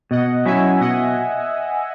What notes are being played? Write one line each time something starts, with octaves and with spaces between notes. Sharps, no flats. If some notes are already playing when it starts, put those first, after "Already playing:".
B2 D#5 F#5
F#3 C#4 E4 E5 G#5
B2 D#5 F#5